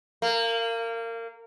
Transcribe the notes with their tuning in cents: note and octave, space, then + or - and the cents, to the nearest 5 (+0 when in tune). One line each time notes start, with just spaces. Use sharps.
A#3 -25